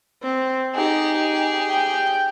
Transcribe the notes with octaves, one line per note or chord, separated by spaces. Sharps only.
C4
D#4 G4 G#4
G5